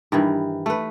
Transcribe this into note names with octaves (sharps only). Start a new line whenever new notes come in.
G2 D#3 E3
A3 B4